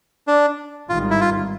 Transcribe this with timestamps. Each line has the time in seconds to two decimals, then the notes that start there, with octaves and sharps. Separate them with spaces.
0.27 D4
0.89 G#1 G2 D#3 G3 F4
1.10 E4
1.21 F4